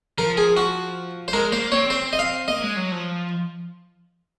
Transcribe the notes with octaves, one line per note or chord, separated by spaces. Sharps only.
F3 A#4
G#4
F#4
C5
G#3 A#4
A#3 C5
C4 C#5
C5
D#5
F5
A#3 D#5
G#3
F#3
F3